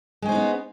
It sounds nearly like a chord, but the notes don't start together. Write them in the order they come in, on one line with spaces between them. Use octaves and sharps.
G#3 C#4 C5 D#4 B3